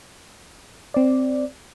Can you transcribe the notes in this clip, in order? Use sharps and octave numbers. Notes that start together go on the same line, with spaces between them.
C4 D5